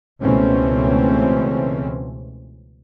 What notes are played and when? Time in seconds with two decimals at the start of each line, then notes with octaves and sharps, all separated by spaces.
0.21 C#2 B2 E3 A3 C4 C#4